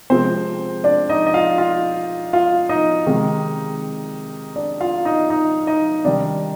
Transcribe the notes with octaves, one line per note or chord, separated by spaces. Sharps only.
C3 F3 G#3 C4 C5
D4 D5
D#4 D#5
D#5
F4 F5
F4 F5
F4 F5
D#4 D#5
C3 D#3 G#3
D4 D5
F4 F5
D#4 D#5
D#4 D#5
D#4 D#5
C3 D#3 G3 D4 D5